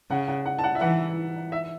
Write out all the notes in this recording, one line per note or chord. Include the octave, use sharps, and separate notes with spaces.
C#3 F#5
F#5
F#5
A5
F#5
E5
E3 F#5
E5